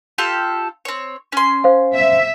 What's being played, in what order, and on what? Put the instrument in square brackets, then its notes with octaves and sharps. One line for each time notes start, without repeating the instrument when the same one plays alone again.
[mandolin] F4 G4 A4
C4 C#5
C#4 C6
[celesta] C5 F5
[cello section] E5